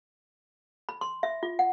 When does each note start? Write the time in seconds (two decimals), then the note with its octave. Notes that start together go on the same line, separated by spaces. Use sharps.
0.89 B5
1.01 C6
1.23 E5
1.43 F4
1.59 F#5